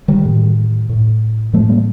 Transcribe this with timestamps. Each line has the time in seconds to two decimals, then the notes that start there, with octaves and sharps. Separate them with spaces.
0.08 D#3 G3
0.25 A2
0.89 A2
1.53 A2 F3 A3
1.69 G3 A#3